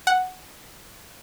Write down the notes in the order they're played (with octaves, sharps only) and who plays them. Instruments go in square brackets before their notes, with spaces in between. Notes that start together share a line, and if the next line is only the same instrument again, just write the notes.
[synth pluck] F#5